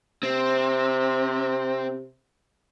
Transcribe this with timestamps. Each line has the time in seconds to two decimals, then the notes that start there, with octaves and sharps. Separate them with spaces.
0.23 C3 C4